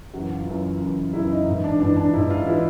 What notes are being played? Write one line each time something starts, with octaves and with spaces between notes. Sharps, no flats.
F#2 C#3 E3 F#4
F4
F#2 C#3 E3
F#2 C#3 E3
F#2 C#3 E3 E4
D#4
G#2 E3
D4
G#2 E3 D4
D4
G#2 E3 E4
F4
E3 E4